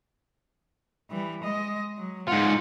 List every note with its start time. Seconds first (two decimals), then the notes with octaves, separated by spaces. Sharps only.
1.11 E3 G3
1.44 G#3 D#5
1.97 F#3
2.28 G#2 F4 F#5